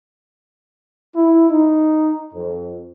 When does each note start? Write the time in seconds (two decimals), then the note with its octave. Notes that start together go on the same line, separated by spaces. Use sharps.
1.15 E4
1.50 D#4
2.33 F2